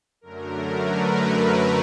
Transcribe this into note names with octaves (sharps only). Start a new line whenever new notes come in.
F#2 D3 F#3 A3 A#4
B4